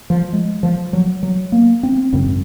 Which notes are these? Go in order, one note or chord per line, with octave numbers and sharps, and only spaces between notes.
F3
G#3
F3
F#3
F#3
A#3
C4
G#1 F#2 C#3 C4